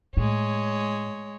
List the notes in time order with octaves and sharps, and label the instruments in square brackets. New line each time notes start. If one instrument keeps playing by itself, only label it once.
[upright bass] A2 [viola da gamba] G#3 C#5